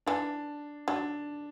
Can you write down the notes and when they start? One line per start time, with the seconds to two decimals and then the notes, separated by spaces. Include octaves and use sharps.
0.06 E3 D4
0.88 F#3 D4